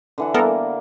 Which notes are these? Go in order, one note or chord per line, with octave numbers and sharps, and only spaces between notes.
D3 E3 F#5
G3 A#3 B3 A4 A#4